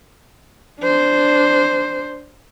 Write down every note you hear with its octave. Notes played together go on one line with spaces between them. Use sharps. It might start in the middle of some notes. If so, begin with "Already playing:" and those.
D4 C5